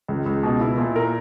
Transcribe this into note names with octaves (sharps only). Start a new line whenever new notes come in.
C#2
C#2
B2
E4
A#2
A#4